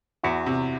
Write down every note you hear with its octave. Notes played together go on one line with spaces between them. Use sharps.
E2 E4 F#4
C3